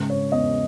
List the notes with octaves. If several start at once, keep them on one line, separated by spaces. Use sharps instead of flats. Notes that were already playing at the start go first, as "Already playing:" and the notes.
Already playing: G#2 C#3
C#5
E2 D#5